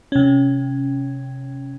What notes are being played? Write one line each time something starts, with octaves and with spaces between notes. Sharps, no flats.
C3 C#4